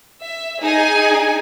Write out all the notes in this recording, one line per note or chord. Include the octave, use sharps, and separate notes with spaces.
E5
D#4 G#4 G#5